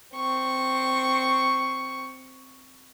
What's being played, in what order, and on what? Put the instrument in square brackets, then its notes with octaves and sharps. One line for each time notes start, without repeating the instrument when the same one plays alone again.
[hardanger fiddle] C4 C#6